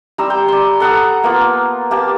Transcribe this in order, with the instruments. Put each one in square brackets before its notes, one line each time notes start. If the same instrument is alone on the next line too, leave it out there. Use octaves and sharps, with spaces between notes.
[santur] G3 A#5 C6 E6
G5
D5 C6
A4 F#5 A#5 D#6
A#3 B3 F4
A#3 G4 A5